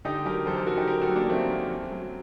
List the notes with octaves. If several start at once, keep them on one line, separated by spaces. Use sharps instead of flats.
D3 D#4 G4
F#3 G4 A#4
F#2 A4 C5
G4 A#4
F#2 F#4 A4
D#4 G4
D3 G4 A#4
F#4 A4
F#3
A#3 D4
F#2 A3 C4
F#2
F#2
F#3